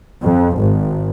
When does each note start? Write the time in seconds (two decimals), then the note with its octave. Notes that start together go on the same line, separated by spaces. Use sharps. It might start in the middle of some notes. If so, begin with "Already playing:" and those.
0.24 F2
0.59 G#1